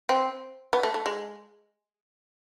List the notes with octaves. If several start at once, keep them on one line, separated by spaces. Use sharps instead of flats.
C4
B3
A3
A3
G#3